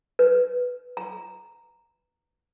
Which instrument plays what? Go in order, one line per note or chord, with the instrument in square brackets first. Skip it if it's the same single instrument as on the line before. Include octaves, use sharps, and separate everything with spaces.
[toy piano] B4
A#5